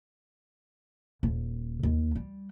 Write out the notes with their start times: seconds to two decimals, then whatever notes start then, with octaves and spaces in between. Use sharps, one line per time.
1.23 D#1
1.83 D#2
2.15 G3